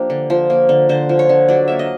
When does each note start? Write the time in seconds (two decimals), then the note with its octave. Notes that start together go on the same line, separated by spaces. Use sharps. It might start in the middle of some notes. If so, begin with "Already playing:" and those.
Already playing: F3 A#3 D4 G4
0.10 D3
0.30 F3
0.50 A#3
0.69 D3
0.89 D3 C5
1.09 F3
1.19 C#5
1.29 D3
1.49 F#3 D5
1.68 A#3 E5
1.79 D#5